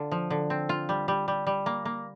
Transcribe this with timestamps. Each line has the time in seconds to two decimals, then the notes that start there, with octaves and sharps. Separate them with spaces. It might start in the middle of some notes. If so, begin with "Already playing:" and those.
Already playing: D3 F4
0.12 F3
0.30 D3
0.50 C4
0.69 F4
0.89 G3
1.08 G3
1.28 G3
1.47 G3
1.66 A#3
1.85 A#3